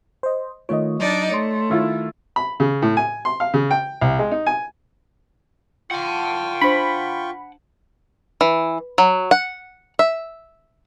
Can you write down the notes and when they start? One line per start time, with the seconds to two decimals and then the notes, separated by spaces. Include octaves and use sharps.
0.23 C5 D#5
0.69 D#3 A3 F4 C#5 D#5
0.99 F#3 D4 D#4 D5
1.31 A3 C#5 C6 C#7
1.70 D#3 E4 F4
2.36 B5
2.60 C#3
2.82 A2
2.97 G#5
3.25 C6
3.40 F5
3.54 C#3
3.71 G5
4.01 C2
4.19 G#3
4.31 D#4
4.47 G#5
5.91 F4 F#5 G5 A5 C#6
6.61 D4 C5 B5
8.41 E3
8.98 F#3
9.31 F#5
9.99 E5